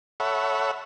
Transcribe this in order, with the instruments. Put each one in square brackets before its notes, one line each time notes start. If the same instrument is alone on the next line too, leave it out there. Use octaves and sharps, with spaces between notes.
[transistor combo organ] A4 C#5 E5 F#5 B5